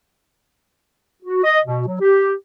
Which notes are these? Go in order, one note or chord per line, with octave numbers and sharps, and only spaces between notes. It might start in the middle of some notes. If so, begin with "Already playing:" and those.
F#4
D#5
B2
F#3
G4